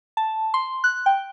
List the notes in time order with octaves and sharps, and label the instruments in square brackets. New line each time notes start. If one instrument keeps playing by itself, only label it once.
[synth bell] A5
C6
F#6
G5